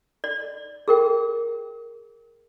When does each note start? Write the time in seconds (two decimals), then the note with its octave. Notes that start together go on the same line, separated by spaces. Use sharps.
0.24 D5
0.88 G#4 A#4 G5